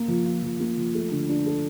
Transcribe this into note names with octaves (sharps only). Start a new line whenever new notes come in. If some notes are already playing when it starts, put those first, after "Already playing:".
Already playing: A#3
F3
F4
F3
A#3
F3
A3
D3
D4
A4